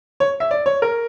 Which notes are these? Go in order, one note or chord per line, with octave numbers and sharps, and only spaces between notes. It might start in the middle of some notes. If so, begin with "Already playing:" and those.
C#5
E5
D5
C#5
A#4